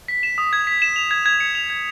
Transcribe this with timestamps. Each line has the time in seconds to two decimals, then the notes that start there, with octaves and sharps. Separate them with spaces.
0.08 B6
0.23 E7
0.38 D#6
0.53 G#6
0.67 B6
0.82 E7
0.96 F7
1.11 G#6
1.26 G#6
1.40 C#7
1.55 F7
1.70 G#6